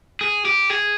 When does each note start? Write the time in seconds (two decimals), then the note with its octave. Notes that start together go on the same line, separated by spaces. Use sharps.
0.21 G#4
0.45 G4
0.70 G#4